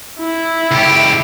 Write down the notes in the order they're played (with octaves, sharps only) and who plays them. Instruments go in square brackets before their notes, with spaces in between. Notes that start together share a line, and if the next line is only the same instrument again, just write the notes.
[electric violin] E4
[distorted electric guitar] C#2 G4